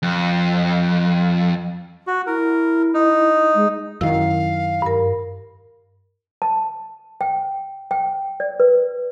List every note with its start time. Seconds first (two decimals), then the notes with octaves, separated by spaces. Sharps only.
0.03 F2
2.07 F#4
2.27 E4 A#4
2.94 D#4
3.55 G#3
4.01 F#2 D#3 E4 F5
4.82 G2 A#4
6.42 A5
7.21 G5
7.91 G5
8.40 D5
8.60 B4